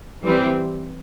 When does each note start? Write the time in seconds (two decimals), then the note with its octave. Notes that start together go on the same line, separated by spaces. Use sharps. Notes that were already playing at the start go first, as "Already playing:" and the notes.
0.23 E3 G3 C4